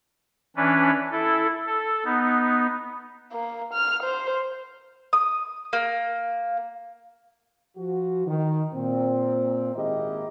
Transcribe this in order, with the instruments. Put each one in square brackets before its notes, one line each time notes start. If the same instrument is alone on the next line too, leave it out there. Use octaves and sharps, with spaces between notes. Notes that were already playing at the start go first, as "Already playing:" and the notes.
[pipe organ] E3 C#4 D4 B4
E4 A4
A4
B3 D#4
[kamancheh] A#3
F6
C5
[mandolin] D#6
A#3
[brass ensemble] F3 F#4
D#3
A#2 C4
G#1 A#3 E4 G4 G#4 D#5